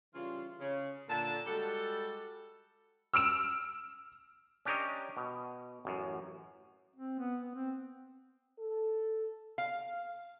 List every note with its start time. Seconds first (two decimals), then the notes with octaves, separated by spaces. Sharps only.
0.15 C#3 E3 G3 F4
0.60 C#3
1.08 A#2 D3 A5
1.46 G3 G#3 F#4 A4
3.14 E6 F6 D7 E7
4.65 C#4 D4 G4 A#4 C#5 D#5
5.17 B2
5.85 A1 F#2
6.96 C4
7.19 B3
7.41 B3
7.55 C4
8.59 A4
9.58 F5